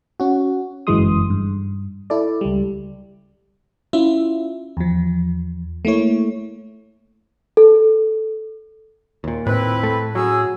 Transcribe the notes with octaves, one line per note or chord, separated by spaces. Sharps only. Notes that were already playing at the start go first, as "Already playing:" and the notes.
C#4 F#4
G1 F#2 E3 G#3 C6 D#6
G2
E4 A4 D5
C#2 G3
C#4 E4 F4 E5
E2 F3
A3 A#3 E4 C#5
A4
D#2 A#2
A2 C4 E4 B4
A3
F#3 C#4 G#4 E6